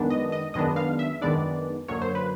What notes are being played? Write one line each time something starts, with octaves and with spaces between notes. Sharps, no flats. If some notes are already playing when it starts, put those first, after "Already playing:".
Already playing: F#2 D#3 G#3 B3 D4
D#5
D#5
F#2 D#3 G#3 B3 D4 D#5
F5
E5
F#2 D#3 G#3 B3 D4 D5
F#2 D3 F#3 A#3 C#5
C5
B4